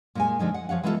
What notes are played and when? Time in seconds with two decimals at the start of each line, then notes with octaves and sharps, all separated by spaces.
0.15 A#2 G#3 G#5
0.39 D3 F3 G#3 D#4
0.54 F#5
0.69 F3 C#5 F5 F#5
0.83 E3 G#3 B3 F4 F#4 A4